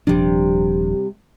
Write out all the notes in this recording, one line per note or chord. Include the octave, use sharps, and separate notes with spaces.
D#1 C3 F3 G3 D4